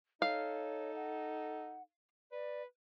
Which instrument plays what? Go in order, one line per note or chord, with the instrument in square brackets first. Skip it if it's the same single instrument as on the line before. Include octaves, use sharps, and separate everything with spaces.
[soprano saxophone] D#4 [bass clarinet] A4 [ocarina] C#5 [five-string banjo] F5
[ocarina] F#5
[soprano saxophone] B4 [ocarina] D5